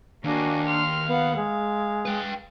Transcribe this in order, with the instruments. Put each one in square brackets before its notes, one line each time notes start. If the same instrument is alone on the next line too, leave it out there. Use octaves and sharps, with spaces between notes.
[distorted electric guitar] D#2 [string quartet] A#3 F#4 G#5 [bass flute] D4
[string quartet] C6 F6
[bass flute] B3 [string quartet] F5 F#5
[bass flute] G#3 [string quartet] F5
[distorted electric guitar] B4 G5